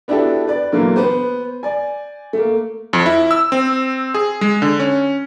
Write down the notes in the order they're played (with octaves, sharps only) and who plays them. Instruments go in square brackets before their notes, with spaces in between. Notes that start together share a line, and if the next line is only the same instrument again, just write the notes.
[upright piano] B3 D4 E4 F#4 G4 A4
B4 D5
A#2 D3 E3 F#3 A#3
B3 B4 C5
D5 G#5
A3 A#3
[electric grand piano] F2
E4
E6
C4
G#4
G#3
D3
C#4